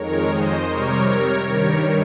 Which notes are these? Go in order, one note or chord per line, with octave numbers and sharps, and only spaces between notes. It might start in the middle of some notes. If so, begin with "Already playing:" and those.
Already playing: F2 D#3 G#3 A#4 C#5
C5 D#5
C3 G3 A#4 C#5
G2 D#3 G3 A#4 C#5